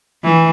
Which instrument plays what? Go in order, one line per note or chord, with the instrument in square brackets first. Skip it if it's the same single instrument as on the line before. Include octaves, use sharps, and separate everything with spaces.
[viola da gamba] E3